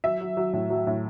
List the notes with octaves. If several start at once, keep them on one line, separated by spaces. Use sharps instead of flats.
F#3 E5
F#3
F#3
A2
F#3
A2